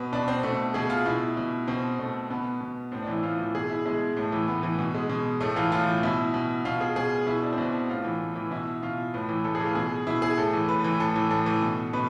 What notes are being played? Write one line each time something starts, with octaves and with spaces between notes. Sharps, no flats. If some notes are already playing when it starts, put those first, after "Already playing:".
Already playing: B2 B4
B2 D4
C4
B2 A3
B2 G#4
F4
B2 E4
B2
B2 C4
B2 A3
B2 B3
B2
A2 C4
D4
E3
E4
A2 F4
E3
B2 G#4
E4
B2 G#3
A2 A3
E3
A2 B3
E3
B2
G#3
B2
A2 A3
E3 F4
A2 F4
E3
B2 E4
B2
B2 F4
G#4
B2 G#4
B2 E4
D4
C4
B2 D4
A2 F4
E3
A2
E3
B2 E4
B2 F4
A2 B4
E3
A2 A4
G#4
E3 F4
B2 G#4
B2 E4
G#4
A2 A4
E3
A2 B4
E3
A2 A4
E3
A2 A4
E3
B2
B2 B4